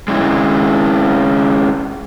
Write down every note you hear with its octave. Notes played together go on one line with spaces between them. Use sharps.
G#3 C#4 E4